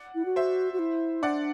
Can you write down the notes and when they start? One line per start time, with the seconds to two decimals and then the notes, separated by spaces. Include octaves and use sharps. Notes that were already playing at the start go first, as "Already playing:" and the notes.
Already playing: D5 F#5
0.15 E4
0.25 F#4
0.36 C5 E5
0.73 F#4
0.79 E4
1.22 D4 D5 F#5